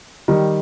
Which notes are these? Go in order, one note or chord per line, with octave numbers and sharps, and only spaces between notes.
D#3 G3